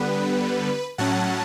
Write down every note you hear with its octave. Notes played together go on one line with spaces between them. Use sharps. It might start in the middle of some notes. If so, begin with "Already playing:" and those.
Already playing: D3 G3 B3 B4
A2 F#3 C#4 F#5 A5